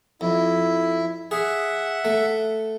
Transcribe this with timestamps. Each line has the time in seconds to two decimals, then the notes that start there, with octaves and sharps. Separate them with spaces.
0.21 F2 E4
1.31 G#4 E5 F#5
2.05 A3